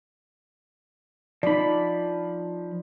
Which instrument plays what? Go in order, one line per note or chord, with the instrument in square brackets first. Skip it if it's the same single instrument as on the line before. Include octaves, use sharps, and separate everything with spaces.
[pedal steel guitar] F3 B5 [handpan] D#4 D5